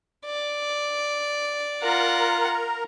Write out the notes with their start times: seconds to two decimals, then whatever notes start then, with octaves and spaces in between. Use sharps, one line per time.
0.25 D5
1.82 F4 A#4 F#5 A#5